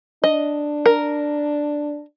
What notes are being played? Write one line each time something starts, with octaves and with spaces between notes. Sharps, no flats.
D4 D#5
A#4